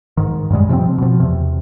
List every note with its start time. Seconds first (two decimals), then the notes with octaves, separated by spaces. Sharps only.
0.17 G#2 D#3
0.50 F#2 A#2 G3 G#3
0.69 C3 F3 A#3 C4
0.98 B2 F3
1.20 E2 C3